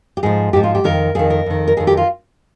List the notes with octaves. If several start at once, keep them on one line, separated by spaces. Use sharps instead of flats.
G4
G#2 F3 G#4
G#2 F3 G4
F4
G4
F2 D#3 A#4
F2 D#3 G#4
A#4
F2 D#3
A#4
F2 D#3 G#4
G4
F4